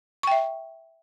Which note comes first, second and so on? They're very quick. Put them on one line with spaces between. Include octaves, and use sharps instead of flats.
C#6 G5 E5